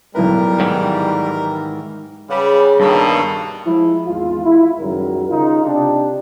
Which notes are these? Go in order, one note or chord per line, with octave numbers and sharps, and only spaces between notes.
B1 A2 G3 A#4 B4
G#2 D#3 E3
C#3 G3 G4 B4 F#5
G2 B2 D#3 A#3 A4 B4
F3 G#3 E4
G#1 E2 G#3 F4
E4
C#2 F#2 D#3 F#3 G3 A#4
C#3 D#4 F4
C3 D4 G4